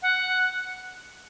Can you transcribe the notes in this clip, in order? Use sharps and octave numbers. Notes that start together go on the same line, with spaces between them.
F#5